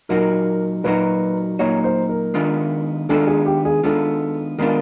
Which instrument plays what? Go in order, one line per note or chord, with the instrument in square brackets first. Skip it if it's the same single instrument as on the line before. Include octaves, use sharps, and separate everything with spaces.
[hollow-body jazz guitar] A#2 F#3 A#3 D#4 F#4 [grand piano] A#4
[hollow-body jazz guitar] A#2 F#3 A#3 D#4 F#4 [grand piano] B4
[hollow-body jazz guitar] A#2 F#3 A#3 D#4 F#4 [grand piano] C#5
[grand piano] C5
A#4
[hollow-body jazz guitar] D#3 G#3 B3 D4 F4
[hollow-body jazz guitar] D#3 G#3 B3 D4 F4 [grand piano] A4
[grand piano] G#4
G4
G#4
[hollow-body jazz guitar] D#3 G#3 B3 D4 F4 [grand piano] A4
[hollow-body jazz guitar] D#3 G#3 B3 D4 F4 [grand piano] A#4